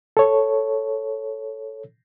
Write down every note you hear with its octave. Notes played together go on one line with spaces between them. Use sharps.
A4 C#5